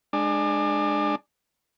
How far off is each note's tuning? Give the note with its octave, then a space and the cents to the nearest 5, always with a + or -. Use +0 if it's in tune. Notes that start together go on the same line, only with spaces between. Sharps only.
G#3 +0 D4 +25